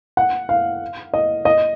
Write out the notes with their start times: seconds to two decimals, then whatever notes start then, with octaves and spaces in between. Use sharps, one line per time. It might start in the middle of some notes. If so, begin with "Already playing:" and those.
0.17 F#5
0.49 F5
1.13 D#5
1.45 D#5